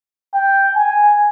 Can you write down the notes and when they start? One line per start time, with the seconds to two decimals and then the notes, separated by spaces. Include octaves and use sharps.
0.34 G5
0.76 G#5